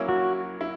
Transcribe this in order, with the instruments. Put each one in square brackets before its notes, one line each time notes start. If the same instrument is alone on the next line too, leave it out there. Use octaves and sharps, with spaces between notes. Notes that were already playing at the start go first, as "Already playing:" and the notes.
Already playing: [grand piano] F#3 A#3 C#4 E4
[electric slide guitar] F#4
[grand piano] E4